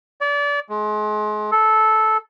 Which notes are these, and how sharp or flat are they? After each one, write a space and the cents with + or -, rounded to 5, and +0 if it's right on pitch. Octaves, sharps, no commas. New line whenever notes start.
D5 -30
G#3 +30
A4 -10